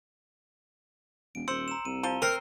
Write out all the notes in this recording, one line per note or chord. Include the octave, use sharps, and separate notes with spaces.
E1 D7
D#1 C5 E6 C#7 F#7
A#5 E7
C2 D#7
F3 A#5 D#7 G7
C4 A#4 E6 C7